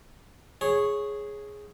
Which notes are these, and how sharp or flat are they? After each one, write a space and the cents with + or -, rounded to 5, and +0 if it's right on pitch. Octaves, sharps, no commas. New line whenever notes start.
G#4 +0 C#5 -10